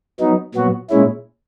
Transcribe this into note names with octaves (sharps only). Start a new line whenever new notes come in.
F#3 B3 D#4
A#2 F#3 B3 F#4
A#2 G#3 C#4 E4